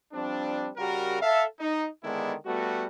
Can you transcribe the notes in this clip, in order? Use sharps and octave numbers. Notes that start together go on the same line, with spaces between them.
F3 G3 C4 D4
C#3 G3 F#4 G4 A#4
A4 E5 F5
D#4
D3 D#3 G#3 B3 D4 E4
G3 A3 B3 F#4